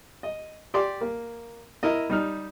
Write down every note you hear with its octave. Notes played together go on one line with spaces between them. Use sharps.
D#5
G4 D5 C6 D6
A#3
E4 A#4 D#5
G3 D#4 F6